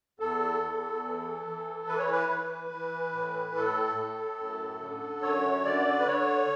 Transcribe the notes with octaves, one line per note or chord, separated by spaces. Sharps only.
E2 A4
E2
E3
E3
E3 B4
C#5
B4
E3
E3
A2
A2 A4
A2
F#2
D3
F#2 C#5
D3 D5
B4
D3 C#5